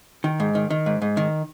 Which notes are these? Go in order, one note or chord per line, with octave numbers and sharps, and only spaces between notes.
D#3
G#2
D#3
D#3
G#2
G#2
D#3